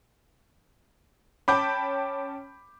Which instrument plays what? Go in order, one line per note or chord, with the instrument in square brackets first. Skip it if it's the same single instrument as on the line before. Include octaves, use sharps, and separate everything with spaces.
[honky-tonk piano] C#4 G5 A5 [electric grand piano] B5 D6 G6